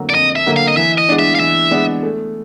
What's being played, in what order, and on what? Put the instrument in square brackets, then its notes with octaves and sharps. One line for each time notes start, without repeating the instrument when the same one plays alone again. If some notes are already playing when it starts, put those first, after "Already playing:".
Already playing: [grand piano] F2 D3 F#3 A#3
[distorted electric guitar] D5
[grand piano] F2 [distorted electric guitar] D#5
[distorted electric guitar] E5
[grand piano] D3 F#3 A#3
[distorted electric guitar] F5
D#5
[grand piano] E3 [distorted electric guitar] E5
[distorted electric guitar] D#5
[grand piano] G#3 B3 D4
[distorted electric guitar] E5
F5
[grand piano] E3 [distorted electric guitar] E5
[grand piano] G#3 B3 D4
A3